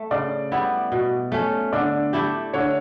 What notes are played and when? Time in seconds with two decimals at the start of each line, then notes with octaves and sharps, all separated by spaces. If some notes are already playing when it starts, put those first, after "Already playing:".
Already playing: A3
0.11 C#3 D5
0.52 G3 B3 E4
0.92 B2
1.32 A3 C#4
1.73 D3 D5
2.13 A3 E4 G4
2.54 D3 C#5